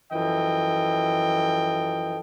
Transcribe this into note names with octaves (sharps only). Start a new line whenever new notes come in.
F#2 E3 F3 A4 D#5 G5